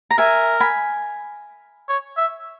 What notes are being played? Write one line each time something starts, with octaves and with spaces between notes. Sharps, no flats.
A#5
A#4 E5 G#5
G#5 B5
C#5
E5